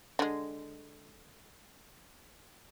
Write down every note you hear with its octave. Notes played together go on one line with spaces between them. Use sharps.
D3 G#3